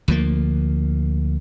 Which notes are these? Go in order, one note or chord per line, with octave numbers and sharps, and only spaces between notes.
D2 F3 A#3